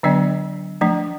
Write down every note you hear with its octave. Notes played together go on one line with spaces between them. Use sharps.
D3 F#3 B3 D4 D5
F3 A3 D4